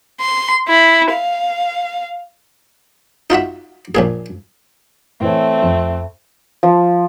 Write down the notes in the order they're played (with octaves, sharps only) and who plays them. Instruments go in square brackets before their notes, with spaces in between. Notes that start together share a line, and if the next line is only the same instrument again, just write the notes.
[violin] C6
E4
F5
[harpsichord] D#4 F4 F#4 E5
A#1 A#2 G#4
[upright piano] A2 E3 C#5 [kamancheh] A3 C4
[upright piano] F2
[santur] F3